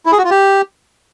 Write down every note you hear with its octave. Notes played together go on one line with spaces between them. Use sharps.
E4
G#4
F#4
F4
G4